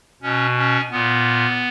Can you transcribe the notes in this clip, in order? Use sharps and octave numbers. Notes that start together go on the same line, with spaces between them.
B2 C#4
C#4
A#2 B3